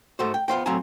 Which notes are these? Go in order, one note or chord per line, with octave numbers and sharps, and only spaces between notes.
G#2 A3 F#4 C5
G5
B3 F4 C5 G5
A2 F#3 C4 F5 G#5 A#5